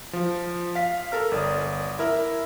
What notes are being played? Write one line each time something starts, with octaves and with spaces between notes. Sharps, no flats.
F3
F5 B6
A4 A#4 F6
G1 D5 D#6
E4 A#4 E5